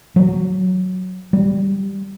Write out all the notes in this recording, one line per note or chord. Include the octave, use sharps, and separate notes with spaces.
F#3
G3